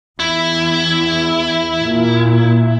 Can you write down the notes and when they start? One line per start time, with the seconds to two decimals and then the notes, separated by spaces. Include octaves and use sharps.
0.19 E2 E4
1.80 A#2